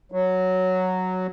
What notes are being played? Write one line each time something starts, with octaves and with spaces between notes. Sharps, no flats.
F#3